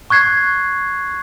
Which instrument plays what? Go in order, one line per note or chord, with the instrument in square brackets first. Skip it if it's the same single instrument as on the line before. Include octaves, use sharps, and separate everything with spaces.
[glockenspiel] C#6 F#6 G#6 C7